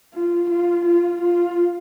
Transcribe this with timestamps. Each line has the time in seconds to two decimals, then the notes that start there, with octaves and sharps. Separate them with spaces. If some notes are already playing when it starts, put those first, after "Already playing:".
0.14 F4
0.50 F4
0.86 F4
1.22 F4